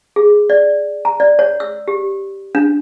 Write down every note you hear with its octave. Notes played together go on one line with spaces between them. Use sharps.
G#4
D5
A#5
D5
C#5
E6
G4
D4